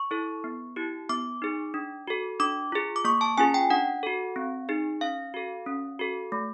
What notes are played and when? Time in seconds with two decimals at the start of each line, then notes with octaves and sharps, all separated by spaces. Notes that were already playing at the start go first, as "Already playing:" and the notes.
Already playing: C#6
0.11 E4 A4
0.44 B3
0.76 E4 G4
1.09 B3 D6
1.42 D#4 G#4
1.74 D4
2.07 F#4 A4
2.40 D4 D6
2.72 F4 G#4
2.96 D6
3.05 A#3 C#6
3.21 A5
3.38 C#4 F4 G#4 G#5
3.54 G5
3.70 D4 F#5
4.03 F#4 A4
4.36 C4
4.69 D#4 G#4
5.01 C#4 F5
5.34 F#4 A4
5.66 C#4
5.99 F#4 A4
6.32 A3